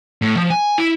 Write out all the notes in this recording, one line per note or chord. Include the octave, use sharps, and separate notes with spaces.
A2
F3
G#5
E4